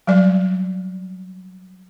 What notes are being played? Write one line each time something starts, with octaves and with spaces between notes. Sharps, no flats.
F#3 G3 D5